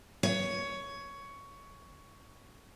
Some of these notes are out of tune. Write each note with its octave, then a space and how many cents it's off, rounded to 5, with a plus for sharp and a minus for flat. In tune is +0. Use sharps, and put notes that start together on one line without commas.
C#5 +10